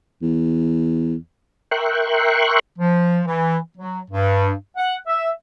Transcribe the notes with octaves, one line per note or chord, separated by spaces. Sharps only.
E2
A#4 E5 G5 C6 C#6 F#6
F3
E3
F#3
G2
F#5
E5